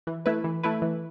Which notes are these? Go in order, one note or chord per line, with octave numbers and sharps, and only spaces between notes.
E3
A3 E4 B4
E3
A3 E4 B4
E3